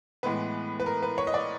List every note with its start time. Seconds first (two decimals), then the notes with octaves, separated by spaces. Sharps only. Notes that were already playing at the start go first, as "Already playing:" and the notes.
0.23 A2 E3 G#3 B3 B4
0.80 B4
0.86 A#4
1.03 B4
1.18 C#5
1.27 D#5
1.34 D5